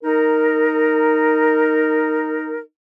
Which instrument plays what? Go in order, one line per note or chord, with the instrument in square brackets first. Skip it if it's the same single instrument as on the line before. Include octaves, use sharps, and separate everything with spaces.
[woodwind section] D#4 A#4